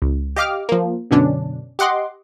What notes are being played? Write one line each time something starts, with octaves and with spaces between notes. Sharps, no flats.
C#2
G4 D#5 F5 D6 F6
F3 A#3
F#2 B2 D3 C#4 D4
G4 D#5 F#5 C6 D6